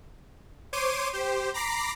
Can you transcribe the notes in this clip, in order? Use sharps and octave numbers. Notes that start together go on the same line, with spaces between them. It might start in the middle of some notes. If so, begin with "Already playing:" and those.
C5 C#5 C6 D6 D#7
G4 C5
A#5 B5 D6 A#6 C7